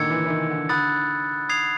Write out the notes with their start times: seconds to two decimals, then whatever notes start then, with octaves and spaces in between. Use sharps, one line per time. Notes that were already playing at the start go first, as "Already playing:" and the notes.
Already playing: A#2 D3 D#3 E6 G#6 C#7
0.10 E3
0.25 E3
0.30 D#3
0.50 D3
0.69 D3 B5 D#6 F#6 A6
1.49 D#6 G#6 C7 F7